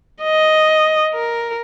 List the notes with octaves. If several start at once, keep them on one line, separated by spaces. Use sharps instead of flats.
D#5
A#4